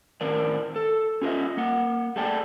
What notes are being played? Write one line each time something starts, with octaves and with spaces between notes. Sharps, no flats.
A2 D#3 C4 A#4 D5
A4
C#4 F4 G#4 B4 D#5 E5
A#3 F#5
A3 G#4 A4 D5 G5